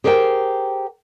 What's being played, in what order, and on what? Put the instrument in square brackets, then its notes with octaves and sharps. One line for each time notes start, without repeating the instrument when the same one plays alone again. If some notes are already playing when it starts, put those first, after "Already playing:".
[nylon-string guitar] G4 G#4 A#4 C5 G5